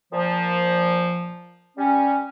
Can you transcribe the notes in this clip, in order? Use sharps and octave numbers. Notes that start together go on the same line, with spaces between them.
A#2 F3
G3 C#4